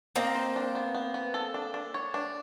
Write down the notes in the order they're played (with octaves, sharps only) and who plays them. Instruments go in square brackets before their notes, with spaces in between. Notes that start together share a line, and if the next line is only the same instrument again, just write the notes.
[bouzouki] A#3 C4 [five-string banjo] D#5
[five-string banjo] C5
D4
B3
B3
B3
A4
D4
D4
C#5
D4